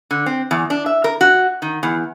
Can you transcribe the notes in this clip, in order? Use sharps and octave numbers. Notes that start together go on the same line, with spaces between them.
D3
C4
E2
D4
E5
A#4
F#4
D#3
E2